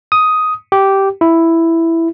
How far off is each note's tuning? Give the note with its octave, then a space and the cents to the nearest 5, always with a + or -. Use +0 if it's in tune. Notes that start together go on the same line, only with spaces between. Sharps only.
D#6 +10
G4 -10
E4 +5